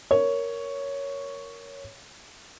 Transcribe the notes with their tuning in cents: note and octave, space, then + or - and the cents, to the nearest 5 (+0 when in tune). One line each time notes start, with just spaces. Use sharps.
A#4 +0 C#5 +5